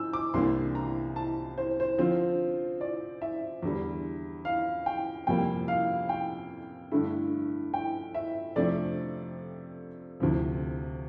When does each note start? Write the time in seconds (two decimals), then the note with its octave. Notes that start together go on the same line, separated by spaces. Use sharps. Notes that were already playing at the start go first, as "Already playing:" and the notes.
Already playing: E6 G6
0.13 D6
0.34 C2 C3 E3 A#3 D4 C6
0.75 A#5
1.16 A5
1.58 C5
1.80 C5
1.98 D3 F3 C4 F4 C5
2.81 D5
3.22 E5
3.63 E2 D3 G3
4.45 F5
4.86 G5
5.27 F2 C3 G3 A#3 G5
5.68 F5
6.09 G5
6.92 G2 D3 A3 E4
7.74 G5
8.14 E5
8.56 F2 C3 F3 A3 D4 D5
10.20 D2 C3 F3